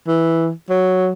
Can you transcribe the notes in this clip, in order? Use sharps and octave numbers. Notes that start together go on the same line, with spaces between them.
E3
F#3